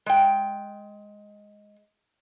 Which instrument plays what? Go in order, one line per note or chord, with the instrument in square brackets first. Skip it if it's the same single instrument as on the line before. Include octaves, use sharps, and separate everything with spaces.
[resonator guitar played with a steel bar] G#3 G5